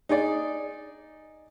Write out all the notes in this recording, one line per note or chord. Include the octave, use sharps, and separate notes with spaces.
D#4 G#4 D5